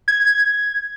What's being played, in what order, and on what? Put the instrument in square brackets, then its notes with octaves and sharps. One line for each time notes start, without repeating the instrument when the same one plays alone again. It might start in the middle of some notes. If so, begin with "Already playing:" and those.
[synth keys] G#6